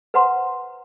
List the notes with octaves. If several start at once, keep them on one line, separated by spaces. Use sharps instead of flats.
B4 C5 F#5 A#5 C6